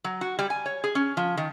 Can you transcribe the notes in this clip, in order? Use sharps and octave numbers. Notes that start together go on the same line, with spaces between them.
F#3
F#4
G3
G#5
C#5
G#4
C#4
F3
D#3